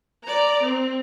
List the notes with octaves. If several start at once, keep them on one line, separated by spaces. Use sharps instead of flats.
D5 A#5
C4